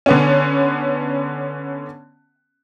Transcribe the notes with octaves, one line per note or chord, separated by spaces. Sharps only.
D3 B3 C#4